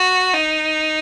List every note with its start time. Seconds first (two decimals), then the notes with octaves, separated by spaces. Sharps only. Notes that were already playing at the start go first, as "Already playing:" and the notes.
Already playing: F#4
0.34 D#4